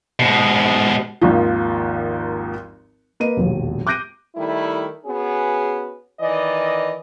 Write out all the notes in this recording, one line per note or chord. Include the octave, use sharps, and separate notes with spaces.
G#2 B2
G#1 D#2 F3
A#3 B4 D#5 D#7
E1 A#1 D#2
D6 F#6 G6 A#6 D7 D#7
D#3 G3 A3 E4
B3 C#4 F#4 G#4
D#3 E3 D5 D#5